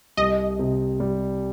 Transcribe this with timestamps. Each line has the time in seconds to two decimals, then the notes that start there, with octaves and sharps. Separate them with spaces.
0.17 C2 D#5
0.59 C3
1.00 G3